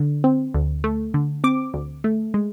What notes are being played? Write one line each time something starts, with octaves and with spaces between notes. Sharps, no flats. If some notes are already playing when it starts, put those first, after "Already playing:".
Already playing: D3
C4
D2
A3
D3
C4 D6
D2
A3
G#3